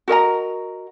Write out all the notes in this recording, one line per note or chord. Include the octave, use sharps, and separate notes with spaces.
F#4 A#4 D#5 A#5